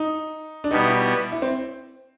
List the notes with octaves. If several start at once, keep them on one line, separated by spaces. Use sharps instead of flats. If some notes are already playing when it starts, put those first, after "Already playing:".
Already playing: D#4
D4
B2 G3 B3 D#4
E4
E4
C4